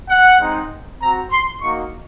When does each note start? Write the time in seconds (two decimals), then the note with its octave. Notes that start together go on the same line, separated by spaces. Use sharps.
0.10 F#5
0.40 G#3 C4 D#4
1.00 C4 F#4 A#5
1.31 C6
1.61 A#3 D#4 F#4 C#6